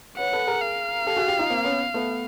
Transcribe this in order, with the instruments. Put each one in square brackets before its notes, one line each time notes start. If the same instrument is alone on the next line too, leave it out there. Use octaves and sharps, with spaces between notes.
[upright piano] B4 C#5 [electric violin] F#5
[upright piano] A4 B4
G#4 A#4
[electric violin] F5
[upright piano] G4 A4
F#4 G#4
F4 G4
D#4 F4
A#3 C4
B3 C#4
A3 B3